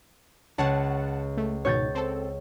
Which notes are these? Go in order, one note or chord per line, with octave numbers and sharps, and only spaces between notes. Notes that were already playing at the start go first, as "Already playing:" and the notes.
C#2 C#5 F#5 A5
A3
G#2 B2 D#3 C#5 G6 A6
C4 A4